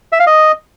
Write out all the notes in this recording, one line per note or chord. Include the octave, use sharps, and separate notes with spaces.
E5
F5
D#5